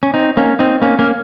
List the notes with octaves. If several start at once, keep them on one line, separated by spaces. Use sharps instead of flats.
C#4
C4 D#4
A#3 C#4
C4 D#4
A#3 C#4
A#3 C#4